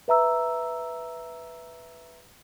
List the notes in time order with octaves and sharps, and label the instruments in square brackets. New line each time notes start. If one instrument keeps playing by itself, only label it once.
[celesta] B4 E5 A#5 E6